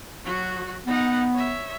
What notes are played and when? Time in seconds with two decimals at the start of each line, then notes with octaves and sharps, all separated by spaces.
0.24 F#3 F#4
0.87 B3 D#4 F#5
1.33 C#5 E5